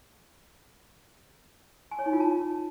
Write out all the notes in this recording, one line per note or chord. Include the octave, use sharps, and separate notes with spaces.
G#5
C#5
D#4
F4
A5